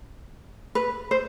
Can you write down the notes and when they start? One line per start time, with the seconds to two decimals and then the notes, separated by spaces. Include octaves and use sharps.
0.75 B4
1.11 C5